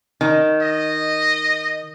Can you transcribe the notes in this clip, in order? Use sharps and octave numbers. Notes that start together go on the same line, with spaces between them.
D#3
D#5